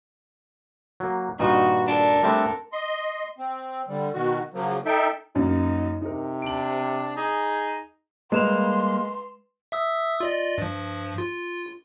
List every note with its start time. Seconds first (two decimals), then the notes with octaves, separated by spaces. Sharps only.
1.00 F#3 A#3
1.39 G2 A#2 D#3 D#4 F#4
1.87 D4 A4 A#4
2.23 G3 A3 C4 D4
2.72 D#5 C6
3.38 C4
3.88 D3 G3
4.14 B2 D#3 F#4
4.54 C#3 F3 F#3 A#3
4.85 D#4 A4 E5 G5
5.35 F#2 A#3 D#4
6.02 C3 D#4 A#4
6.42 D4 D7 F#7
7.16 D#4 G#4
8.32 G3 G#3 A#3 B4 C6 E7 F7
9.72 E5 D#6 E6
10.20 F4 D5 D#5
10.58 G2 F3
11.18 F4